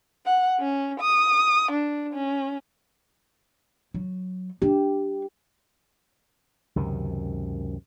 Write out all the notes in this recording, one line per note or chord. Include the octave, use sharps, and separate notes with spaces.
F#5
C#4
D#6
D4
C#4
F#3
D4 G4
C#2 F#2 C3 D#3